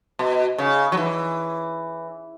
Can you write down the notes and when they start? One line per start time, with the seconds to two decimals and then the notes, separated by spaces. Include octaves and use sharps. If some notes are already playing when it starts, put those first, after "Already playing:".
0.19 B2
0.58 C#3
0.92 F#3
0.97 E3